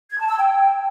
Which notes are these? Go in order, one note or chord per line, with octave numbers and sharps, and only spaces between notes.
G#6
A5
E6
G5